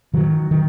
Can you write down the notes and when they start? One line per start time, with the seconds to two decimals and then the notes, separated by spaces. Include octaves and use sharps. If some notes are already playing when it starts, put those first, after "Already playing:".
0.14 D#3 F#3
0.51 D#3